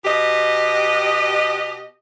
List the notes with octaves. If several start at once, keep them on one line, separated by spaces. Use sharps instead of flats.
B2 G4 D#5